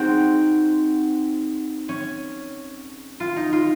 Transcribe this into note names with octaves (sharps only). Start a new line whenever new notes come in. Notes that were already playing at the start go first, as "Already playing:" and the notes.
Already playing: C4 D#4 F#4 G#4
C#4
F4
D#4
F4